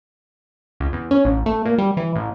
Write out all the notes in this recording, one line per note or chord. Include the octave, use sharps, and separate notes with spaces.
C#2
E2
C#4
A1
A3
A#2
G3
E3
A1